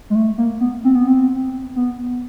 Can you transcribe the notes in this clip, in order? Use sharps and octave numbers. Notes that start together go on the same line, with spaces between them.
G#3
A3
A#3
B3
C4
B3
C4
B3